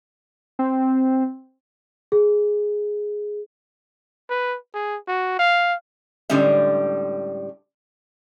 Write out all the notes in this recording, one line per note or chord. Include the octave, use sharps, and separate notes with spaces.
C4
G#4
B4
G#4
F#4
F5
A2 D3 G3 G#3 C#4 E5